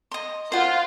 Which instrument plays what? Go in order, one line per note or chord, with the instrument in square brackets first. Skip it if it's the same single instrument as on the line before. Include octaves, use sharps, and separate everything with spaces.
[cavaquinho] D#5 C6
[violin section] F4 [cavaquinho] C5 F#5